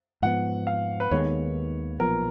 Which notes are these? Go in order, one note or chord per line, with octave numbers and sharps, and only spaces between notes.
G#2 F3 B3 F#5
F5
B4
D#2 D#3 G#3 B3 C#5
B1 A#2 F3 B3 A#4